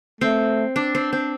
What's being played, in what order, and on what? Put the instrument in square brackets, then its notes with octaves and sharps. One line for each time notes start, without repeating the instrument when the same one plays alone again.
[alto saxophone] A3 [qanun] C4
[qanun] D4
C4
C4